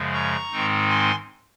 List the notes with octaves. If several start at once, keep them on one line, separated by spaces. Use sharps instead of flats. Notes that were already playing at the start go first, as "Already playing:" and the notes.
Already playing: F#2 C#3 F3 G#3
A#5 C#6
G#2 D#3 G#3 C4 D#4
G#5 C6